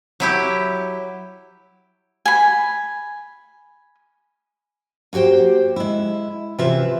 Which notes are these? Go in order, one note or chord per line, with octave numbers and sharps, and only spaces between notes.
F#3 E4 G4
G#5 B5
A#3 F#4 G4 C5 G5
G#3 E4
C3 E3 C4 F4 B4 E5